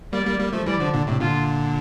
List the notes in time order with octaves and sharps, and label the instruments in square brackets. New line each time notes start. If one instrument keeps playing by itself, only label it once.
[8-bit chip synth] G3 A#3 [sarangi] D5
[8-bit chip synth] G3 A#3
G3 A#3
F3 A3
[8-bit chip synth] E3 G3 [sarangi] D5
[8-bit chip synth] D3 F3
A#2 D3
A2 C3
[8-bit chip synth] A#2 D3 [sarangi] F4